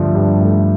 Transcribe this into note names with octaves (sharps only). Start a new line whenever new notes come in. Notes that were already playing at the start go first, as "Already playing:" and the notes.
Already playing: G2 D3 F3 A3
G2
A3